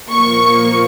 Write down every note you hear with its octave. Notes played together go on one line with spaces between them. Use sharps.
A#2 F3 A#3 C#6